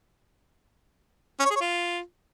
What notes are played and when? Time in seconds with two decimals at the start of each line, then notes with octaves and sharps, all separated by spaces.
1.40 C#4
1.45 C#5
1.50 G#4
1.56 C#5
1.61 F4